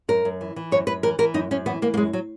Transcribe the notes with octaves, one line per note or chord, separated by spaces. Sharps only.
F#2 A#4
F#2
E3
E3
F#2 C#5
F#2 B4
E3 A#4
E3 A#4
F#2 D#4
F#2 C#4
E3 B3
E3 A#3
A#3
F#2 G#3
F#3